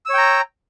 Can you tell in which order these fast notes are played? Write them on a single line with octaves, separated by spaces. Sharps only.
E6 C#5 G5 A#5